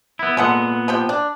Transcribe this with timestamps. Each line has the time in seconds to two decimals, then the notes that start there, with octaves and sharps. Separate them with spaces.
0.19 B3 E4
0.37 A#2 G#3 B3 A4 F#5
0.88 F3 G4 G5
1.09 D4